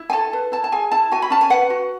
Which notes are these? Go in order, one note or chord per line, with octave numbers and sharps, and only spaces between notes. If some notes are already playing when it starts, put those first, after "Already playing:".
Already playing: E4
G#5
A4 A5
B4
E4 A5
A5
G#4 G#5
E4 A5
F#4 G#5
B5
C#4 A5
G#5
B4 F#5
F#4